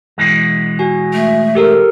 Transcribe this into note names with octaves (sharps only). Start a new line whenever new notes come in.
B2 E3 G#3
F#4 G#5
A3
G4 A4 A#4